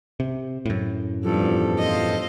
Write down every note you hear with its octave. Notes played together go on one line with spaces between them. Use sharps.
C3
F#2 A2
E2 G2 F3 A4
F4 C5 D#5